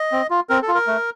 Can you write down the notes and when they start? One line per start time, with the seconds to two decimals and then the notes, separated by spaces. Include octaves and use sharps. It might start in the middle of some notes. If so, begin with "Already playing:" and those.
Already playing: D#5
0.12 C4
0.30 F4
0.49 C4 A#4
0.62 A4
0.68 F4
0.75 A#4
0.87 A3